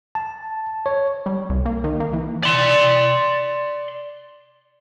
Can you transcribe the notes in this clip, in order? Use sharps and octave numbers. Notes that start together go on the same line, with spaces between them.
A5
C#5
G3
C2
A#3
D#3
A#3
E3
D5 C6